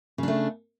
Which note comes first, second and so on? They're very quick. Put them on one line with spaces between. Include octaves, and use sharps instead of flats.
C#3 D4 A3